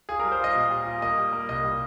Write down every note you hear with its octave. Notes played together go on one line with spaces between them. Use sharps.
F4 G#4
G3 A#4
C5
F4 D#5
A#2
G3
F4
A#3 D#5
G3
A#3
C2 D#5
G3